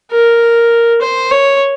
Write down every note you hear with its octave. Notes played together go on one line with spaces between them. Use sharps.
A#4
C5
C#5